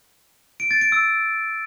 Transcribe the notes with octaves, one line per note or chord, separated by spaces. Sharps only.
D7
A6
D7
E6